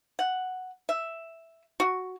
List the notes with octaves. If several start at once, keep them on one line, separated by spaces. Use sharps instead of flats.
F#5
E5
F#4